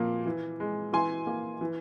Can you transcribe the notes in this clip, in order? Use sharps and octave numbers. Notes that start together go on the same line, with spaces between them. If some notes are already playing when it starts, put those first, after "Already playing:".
Already playing: A#2 F3 A#3
E3
G#3
E3 G#5 C6
A#3
E3